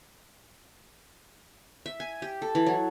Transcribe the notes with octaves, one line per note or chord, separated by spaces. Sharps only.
E5
G#5
G4
A4
E3
F#3